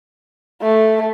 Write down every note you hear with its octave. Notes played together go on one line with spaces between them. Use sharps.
A3